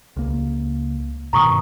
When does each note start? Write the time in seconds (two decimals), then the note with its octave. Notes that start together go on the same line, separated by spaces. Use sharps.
0.16 C#2 A#3
1.33 G2 B2 D#3 A#5 C#6 D#6